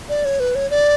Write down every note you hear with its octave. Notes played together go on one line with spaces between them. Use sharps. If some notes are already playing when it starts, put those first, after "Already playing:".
D5
C#5
B4
C#5
D5